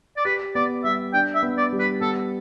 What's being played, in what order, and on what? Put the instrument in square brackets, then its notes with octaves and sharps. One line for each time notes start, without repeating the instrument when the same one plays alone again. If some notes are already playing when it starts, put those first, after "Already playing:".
[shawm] D5
[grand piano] G4 [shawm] B4
[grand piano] B3 [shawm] D5
[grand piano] G3 [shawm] E5
[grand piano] D4 [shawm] G5
[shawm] E5
[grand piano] B3
[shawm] D5
[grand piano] G3
[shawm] B4
[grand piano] B3 [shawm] A4